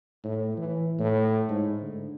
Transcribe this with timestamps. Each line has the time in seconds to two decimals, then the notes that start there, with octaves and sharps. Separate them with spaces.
0.24 A2
0.57 E3
0.99 A2
1.49 G#2
1.82 D3